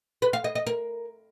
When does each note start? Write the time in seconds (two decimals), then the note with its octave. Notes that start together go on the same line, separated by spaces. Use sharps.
0.22 B4
0.33 F5
0.44 D#5
0.55 D#5
0.67 A#4